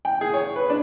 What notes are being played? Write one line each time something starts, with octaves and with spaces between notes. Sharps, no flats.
G5
G#4
C#5
B4
D4